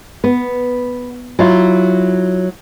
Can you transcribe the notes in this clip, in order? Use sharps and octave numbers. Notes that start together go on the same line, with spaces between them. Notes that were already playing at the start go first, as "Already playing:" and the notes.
B3
F#3 E4 F4